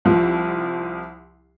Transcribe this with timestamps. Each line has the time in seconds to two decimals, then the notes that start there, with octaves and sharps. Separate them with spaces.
0.05 C2 F3